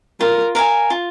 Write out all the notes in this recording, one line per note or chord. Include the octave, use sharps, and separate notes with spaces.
F4 A#4
A#4 F5 G#5
F4